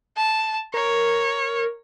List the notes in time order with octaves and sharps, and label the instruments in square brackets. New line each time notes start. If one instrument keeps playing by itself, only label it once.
[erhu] A5
[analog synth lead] A#4 [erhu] C#5